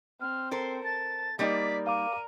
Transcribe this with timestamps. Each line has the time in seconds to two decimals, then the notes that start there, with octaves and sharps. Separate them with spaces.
0.21 C4 F6
0.51 A4 A#4 C5 C6
0.85 A5 A6
1.39 G3 A#3 D#4 D5 B6
1.87 A#4 F5 D6 D#7